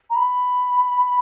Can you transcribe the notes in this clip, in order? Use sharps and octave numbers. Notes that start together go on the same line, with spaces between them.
A#5
B5